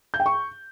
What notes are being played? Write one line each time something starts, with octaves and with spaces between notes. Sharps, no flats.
G6
G5
C#6